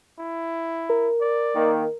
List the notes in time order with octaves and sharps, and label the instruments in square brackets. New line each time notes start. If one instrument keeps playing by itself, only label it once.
[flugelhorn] E4
[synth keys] A#4
[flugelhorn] D5
[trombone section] D#3 A#3